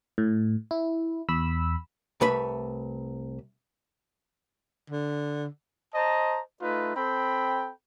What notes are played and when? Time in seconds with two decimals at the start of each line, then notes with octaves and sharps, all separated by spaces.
0.18 A2
0.71 E4
1.29 E2 B5 E6
2.21 C2 A3 B4 E5 B5
4.90 D3
5.95 C5 D#5 A5 A#5
6.62 A3 D#4 F4 B4
6.96 C4 A4 G5 B5